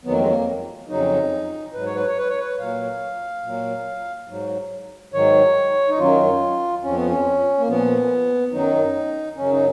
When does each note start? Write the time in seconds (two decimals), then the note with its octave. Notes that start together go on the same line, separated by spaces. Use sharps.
0.05 F2 D#3 F#3 B3
0.12 A#3
0.20 G#3
0.28 A#3
0.89 F2 C#3 F#3 D#4
1.74 G#2 F#3 B4
1.85 C#5
1.95 B4
2.07 C#5
2.18 B4
2.28 C#5
2.39 B4
2.59 A#2 F#3 F5
3.43 A#2 F#3
4.28 G#2 F#3
5.13 G#2 D#3 F#3 C#5
5.89 D#4
5.98 F#2 D#3 F#3 F4
6.83 F2 F3 C#4
6.95 B3
7.07 C#4
7.59 A#3
7.68 A#2 F3 B3
8.52 F#2 D#3 F#3 D#4
9.37 F#2 C#3 F#3 C#4
9.51 D#4